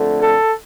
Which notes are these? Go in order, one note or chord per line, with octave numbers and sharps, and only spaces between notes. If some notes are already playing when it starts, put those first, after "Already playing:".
Already playing: F2 D3 A3
A4